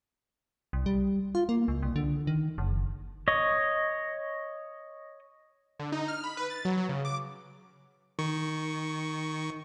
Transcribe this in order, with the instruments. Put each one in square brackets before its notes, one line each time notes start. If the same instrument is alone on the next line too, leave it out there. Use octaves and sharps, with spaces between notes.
[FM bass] C2
G3
F4
A#3
C#2
C2
D3
D#3
F#1
[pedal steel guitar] C#5 D#5
[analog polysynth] D3
D#4
F6
B5
B4
A6
F#3
F#3
C#3
D6
[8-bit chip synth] D#3 C#6